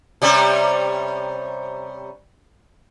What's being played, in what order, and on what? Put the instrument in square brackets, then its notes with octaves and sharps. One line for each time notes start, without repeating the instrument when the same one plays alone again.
[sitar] C3 G3 C#4